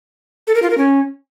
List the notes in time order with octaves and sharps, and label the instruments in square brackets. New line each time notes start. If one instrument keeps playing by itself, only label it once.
[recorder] A4
A#4
F4
A#4
C#4